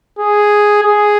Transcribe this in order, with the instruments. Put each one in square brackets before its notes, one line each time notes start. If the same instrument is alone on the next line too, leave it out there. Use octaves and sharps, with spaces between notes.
[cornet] G#4
G#4